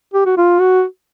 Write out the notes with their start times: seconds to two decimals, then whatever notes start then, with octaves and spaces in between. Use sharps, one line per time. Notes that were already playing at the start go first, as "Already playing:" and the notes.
0.14 G4
0.25 F#4
0.37 F4
0.59 F#4